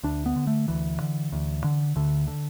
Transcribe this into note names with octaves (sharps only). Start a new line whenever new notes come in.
D2 D4
B3
D3
A3
D2 E3
D3
D2
D3
D2 D3
D3